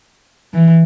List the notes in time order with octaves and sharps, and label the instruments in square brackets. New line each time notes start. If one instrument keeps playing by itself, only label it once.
[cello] E3